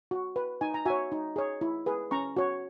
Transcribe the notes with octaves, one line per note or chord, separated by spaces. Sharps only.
F#4
B4
D#4 G#5
A#5
F#4 C#5 E5 G#5
D#4
G#4 C#5
E4
G#4 B4
C#4 A#5 C#6
F#4 C#5